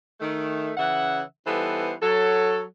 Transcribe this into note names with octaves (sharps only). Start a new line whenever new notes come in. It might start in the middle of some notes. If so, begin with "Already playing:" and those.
D#3 A3
C#3 E3 E5 F#5
E3 G3 B3 D#4 A4 C5
F#3 A4